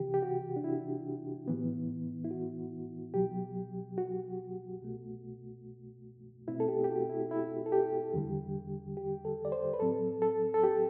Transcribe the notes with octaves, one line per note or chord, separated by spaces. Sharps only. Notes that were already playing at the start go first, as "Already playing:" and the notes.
Already playing: C2 C3 E3 G4
G4
F#4
D4
E4
A2 E3 B3
E4
F#4
C2 B2 F#3 G4
F#4
C2 B2 A3
B2 A3 C4 E4
A4
G4
G4
F#4
E4
E4
A4
G4
E2 D3 G3
G4
A4
D5
C5
B4
A2 F#3 C4 A4
A4
A4
G4